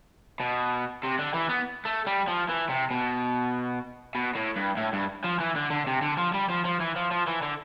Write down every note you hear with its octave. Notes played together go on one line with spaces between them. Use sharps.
B2
C3
D3
E3
B3
A3
G3
F3
E3
C3
B2
B2
A2
G2
A2
G2
F3
E3
D3
D3
C3
D3
F3
G3
F3
F3
E3
F3
F3
E3
D3